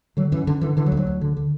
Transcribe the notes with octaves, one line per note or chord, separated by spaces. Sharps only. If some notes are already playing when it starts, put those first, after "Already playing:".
D3 F#3
F#2 E3
F#2 D3
D3 E3
D3 E3
F#3
D2
F#3
D2
D3
D3